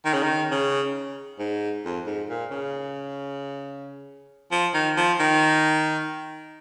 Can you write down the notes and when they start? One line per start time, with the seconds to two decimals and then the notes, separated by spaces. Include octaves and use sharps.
0.05 D#3
0.13 C#3
0.23 D#3
0.51 C#3
1.39 G#2
1.85 F2
2.06 G#2
2.29 A#2
2.51 C#3
4.51 F3
4.74 D#3
4.97 F3
5.20 D#3